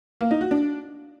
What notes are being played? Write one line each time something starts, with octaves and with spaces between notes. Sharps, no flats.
A#3
D#4
F#4
D4